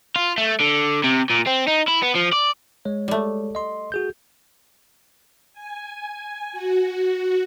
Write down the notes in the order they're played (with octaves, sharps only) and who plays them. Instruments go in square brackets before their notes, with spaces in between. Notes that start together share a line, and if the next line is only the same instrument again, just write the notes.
[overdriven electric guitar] F4
A3
D3
C3
A#2
C4
D#4
E4
B3
F3
D5
[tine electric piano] G#3 C#5
[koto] G3 A3
[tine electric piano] D#5 C6
F#4 G#4 G6
[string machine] G#5
F#4